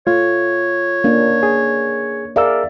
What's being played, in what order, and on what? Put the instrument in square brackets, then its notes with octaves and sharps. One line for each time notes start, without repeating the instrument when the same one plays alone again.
[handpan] A3 [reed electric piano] F4 [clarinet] C#5
[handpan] A#3 C#4 D4
[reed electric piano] G#4
[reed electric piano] G#4 A#4 E6 [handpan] D5 E5 F5